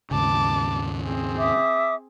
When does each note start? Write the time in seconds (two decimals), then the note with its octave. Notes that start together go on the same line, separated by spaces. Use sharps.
0.11 D#2 G#2 C#3 A5 D6
1.03 C4 G#4
1.38 E5 D6 D#6